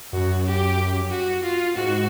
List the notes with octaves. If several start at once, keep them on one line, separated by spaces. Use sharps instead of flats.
F#2 F#4
G4
F#4
F4
G#2 F#4